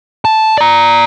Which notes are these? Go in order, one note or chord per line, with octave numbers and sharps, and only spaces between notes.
A5
D5 A#5